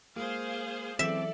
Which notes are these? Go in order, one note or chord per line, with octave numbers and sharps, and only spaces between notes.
G#3 A#3 F4 G#4 C5 F5
E3 F#3 C4 A4 D5 E5